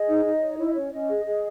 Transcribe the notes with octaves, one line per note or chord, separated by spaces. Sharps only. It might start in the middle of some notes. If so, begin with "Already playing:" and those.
Already playing: G#4 D#5
D#4
D#4
C#5
E4 C#5
D#5
C#4 C#5
C#4 D#5
G#4
G#4